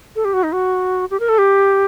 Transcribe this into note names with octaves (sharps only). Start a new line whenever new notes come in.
A4
G4
F#4
D#4
F#4
G4
A#4
A4
G4